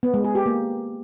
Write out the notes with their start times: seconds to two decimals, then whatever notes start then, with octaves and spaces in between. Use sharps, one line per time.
0.03 B3
0.14 G#3
0.24 G#4
0.35 G4
0.46 A#3